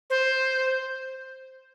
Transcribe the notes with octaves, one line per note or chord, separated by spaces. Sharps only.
C5